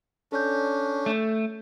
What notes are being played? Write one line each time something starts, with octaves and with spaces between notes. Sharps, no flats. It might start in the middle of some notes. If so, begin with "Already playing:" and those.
C#4 D4 A4 G6
A3